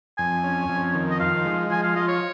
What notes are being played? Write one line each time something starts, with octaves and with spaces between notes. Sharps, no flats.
F2 G#5
C#4
F2
D#3
D#5
F3 F5
G#3
F3 G#5
F5
F4 D#5
C#5